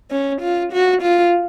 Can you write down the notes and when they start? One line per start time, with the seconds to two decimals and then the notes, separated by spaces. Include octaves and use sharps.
0.11 C#4
0.41 F4
0.72 F#4
1.02 F4